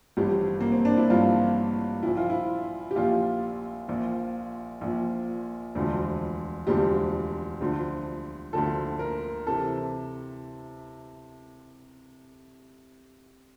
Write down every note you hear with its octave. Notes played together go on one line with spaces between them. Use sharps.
A1 G2 F3 G4
A#3
C4
D4
E4
A1 G2 F3 F4
A#1 A#2 F3 E4
F4
E4
G4
A#1 A#2 F3 F4
A#1 A#2 F3
A#1 A#2 F3
E1 D2 D3 F3
E1 D2 D3 F3 G4
D2 D3 F3
D2 D3 F3 A4
A#4
C3 E3 A4